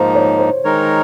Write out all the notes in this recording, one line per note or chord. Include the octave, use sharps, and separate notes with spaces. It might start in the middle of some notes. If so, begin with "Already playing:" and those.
Already playing: G#2 F3 A#3 D#4 C5
C#5
C5
D#3 G#3 D#4 A#4 C#5